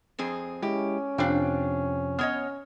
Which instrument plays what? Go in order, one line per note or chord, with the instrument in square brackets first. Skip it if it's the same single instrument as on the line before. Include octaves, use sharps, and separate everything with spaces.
[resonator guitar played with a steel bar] F2 C4 G#4
[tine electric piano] G#3 E4 [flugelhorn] C#4 [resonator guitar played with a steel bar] G4
[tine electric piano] F2 C3 F3 [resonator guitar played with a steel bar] D4 F5 G5
[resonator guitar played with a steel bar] B3 C#5 D#5 [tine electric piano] F6